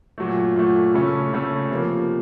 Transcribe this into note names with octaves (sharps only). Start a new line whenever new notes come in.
A#2 F#3 A3
A#2 F#3 A3
C#3 A3 C#4 A4
C#3 A3 C#4 A4
C3 F3 A#3